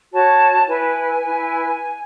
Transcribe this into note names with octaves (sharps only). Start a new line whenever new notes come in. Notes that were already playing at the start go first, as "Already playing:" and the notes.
F#4 C#5 A5
E4 B4 G#5
E4 B4